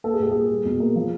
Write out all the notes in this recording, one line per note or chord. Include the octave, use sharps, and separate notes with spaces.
A#3 A4
G#4
A#2 G4
A#3 G#4
G3
B2
A#3
F3